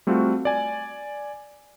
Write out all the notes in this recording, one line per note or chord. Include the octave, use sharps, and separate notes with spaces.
G3 A3 C4 F4 F#4
D5 G#5